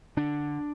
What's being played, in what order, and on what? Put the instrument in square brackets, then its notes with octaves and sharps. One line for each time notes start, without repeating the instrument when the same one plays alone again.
[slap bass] D3 D4